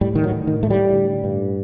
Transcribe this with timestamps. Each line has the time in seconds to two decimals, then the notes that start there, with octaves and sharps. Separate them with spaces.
0.01 A2 G3
0.15 D#3
0.24 F#3
0.32 A2
0.47 D#3
0.63 A2 A3
0.70 G3
0.93 D3
1.24 G2